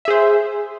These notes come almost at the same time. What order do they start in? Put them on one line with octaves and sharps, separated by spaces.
E5 G#4 C5